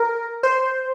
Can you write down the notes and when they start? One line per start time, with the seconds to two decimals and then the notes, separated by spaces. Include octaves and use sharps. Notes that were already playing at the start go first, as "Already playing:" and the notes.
Already playing: A#4
0.43 C5